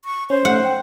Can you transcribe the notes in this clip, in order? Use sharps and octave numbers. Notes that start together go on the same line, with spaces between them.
C#6
C#4 C5 C#5
A3 F#5
G5